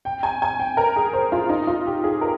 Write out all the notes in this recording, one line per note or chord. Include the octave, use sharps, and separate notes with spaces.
G5
G#5
G#5
G5
A#4
G#4
C5
F4
D#4
F4
G4
G#4
A#4